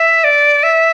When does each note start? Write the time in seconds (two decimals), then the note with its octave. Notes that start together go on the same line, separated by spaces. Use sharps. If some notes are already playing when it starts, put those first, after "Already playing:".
Already playing: E5
0.24 D5
0.63 E5